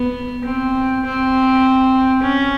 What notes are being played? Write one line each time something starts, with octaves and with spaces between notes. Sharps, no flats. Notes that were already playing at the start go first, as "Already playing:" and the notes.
Already playing: B3
C4
C4
C#4